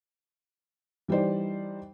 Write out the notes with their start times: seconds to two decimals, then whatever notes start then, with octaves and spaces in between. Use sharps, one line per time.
1.08 E3 G3 D#4 C5 D5